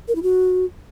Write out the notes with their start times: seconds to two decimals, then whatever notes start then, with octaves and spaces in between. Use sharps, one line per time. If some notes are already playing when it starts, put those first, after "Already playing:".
0.08 A#4
0.15 E4
0.23 F#4